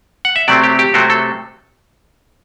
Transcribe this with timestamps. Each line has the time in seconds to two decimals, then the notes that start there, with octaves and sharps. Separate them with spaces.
0.25 F#5
0.36 E5
0.48 C3 F#3 A3 C4 D5
0.63 G4
0.79 G4
0.94 C3 F#3 A3 C4 F#4
1.10 A4